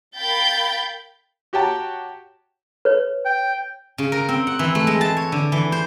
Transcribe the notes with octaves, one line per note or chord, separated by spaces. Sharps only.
A#4 F5 G5 B5 G6 A6
F#4 G4 C#5 G5 A5 A#5
B4 C#5
G5
C#3
A#4
C4
F#5
E3
A3
G#3
A5
C#5
D3
E3
C5